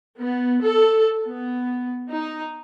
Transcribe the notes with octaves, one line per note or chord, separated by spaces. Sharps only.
B3
A4
B3
D#4